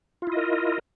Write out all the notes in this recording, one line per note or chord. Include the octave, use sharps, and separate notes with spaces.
E4 F4 A#4 D#5